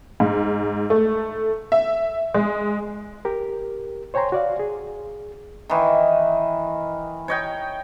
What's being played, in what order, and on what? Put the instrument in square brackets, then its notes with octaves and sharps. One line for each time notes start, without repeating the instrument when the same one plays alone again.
[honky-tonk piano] G#2
A3
E5
G#3
[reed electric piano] G4 A#4
C5 C#5 G5 G#5 A#5 C6
F#4 D5 F5
G#4
[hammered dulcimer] D#3 E3
C#5 D#5 G5